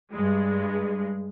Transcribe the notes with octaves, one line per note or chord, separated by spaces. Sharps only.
G2 G#3